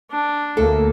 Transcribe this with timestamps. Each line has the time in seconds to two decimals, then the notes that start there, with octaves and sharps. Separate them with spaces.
0.11 D4
0.57 D2 A3 A#3 A4